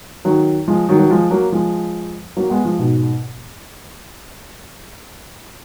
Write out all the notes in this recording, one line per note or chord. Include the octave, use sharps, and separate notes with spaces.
D#3 F#3
F3 G#3
D#3 F#3
F#3
F3 G#3
F#3 A#3
F3 G#3
F#3 A#3
G#3 B3
F3 G#3
G#2 B2